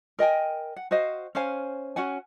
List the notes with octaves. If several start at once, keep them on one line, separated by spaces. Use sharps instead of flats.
A#4 D#5 G5 G#5
F#5
F#4 C5 D#5 F5
C#4 C5 F5 G#5
C#4 F#4 F#5 G#5